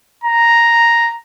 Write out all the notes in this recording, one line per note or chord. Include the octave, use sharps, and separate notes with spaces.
A#5